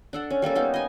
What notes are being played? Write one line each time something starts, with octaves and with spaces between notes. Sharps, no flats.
D4 A4 F#5
C#4
G3 A#3 C#4 A4
G3 A#3 B3 D#4
D#5 G#5